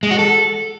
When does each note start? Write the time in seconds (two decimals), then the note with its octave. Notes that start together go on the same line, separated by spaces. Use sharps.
0.03 G#3
0.11 F#4
0.19 A4